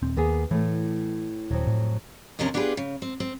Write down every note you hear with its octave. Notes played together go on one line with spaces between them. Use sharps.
D#1 C4
D#2 A#3 B3 G#4
A2 E3 A3
D#1 F2 F#3
A2
D#2 C3 F3 C#4 D4 A#4
B3 D4 F4 G4 G#4 B4
C#3
C4
C4